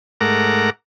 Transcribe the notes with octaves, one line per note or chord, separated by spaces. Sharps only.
G#2 A3 A#4 F#5 A#5 D6